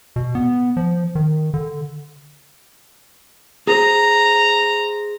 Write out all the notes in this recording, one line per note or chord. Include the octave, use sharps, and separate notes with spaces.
B2
B3
F3
D#3
D3
G#4 C5 A#5